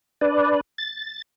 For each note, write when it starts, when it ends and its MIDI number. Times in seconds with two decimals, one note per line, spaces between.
0.21 0.61 62
0.21 0.61 71
0.21 0.61 74
0.78 1.22 93